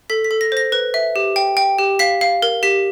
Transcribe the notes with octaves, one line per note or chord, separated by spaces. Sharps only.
A4 B6
B6
A4
A#6
C5 A#6
B4
E5
G4
G5
G5
G4
F5 B6
F5
A#4
G4 B6